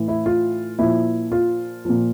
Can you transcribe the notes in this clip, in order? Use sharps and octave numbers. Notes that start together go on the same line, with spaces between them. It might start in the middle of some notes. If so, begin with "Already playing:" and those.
Already playing: A2 E3
E4
F4
A#2 F3 E4
F4
A#2 F3